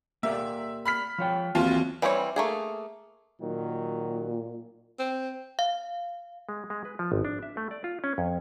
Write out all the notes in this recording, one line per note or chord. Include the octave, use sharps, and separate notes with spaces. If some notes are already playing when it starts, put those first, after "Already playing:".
A#3 G4 D5 E5
B5 F6 B6
F3 C#5 G5
D#2 E3 F#3 C4 F4
E3 G3 C4 D4 C#5
A3 A#3 G#4
A#2 D#3 F#3
C4
F5
G#3
G#3
B4
F3
G#1
D4
E5
A3
D5
F4
C#4
F2